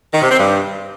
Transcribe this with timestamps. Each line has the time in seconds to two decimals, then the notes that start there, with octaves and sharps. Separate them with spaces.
0.13 D#3
0.21 C3
0.30 C4
0.38 G2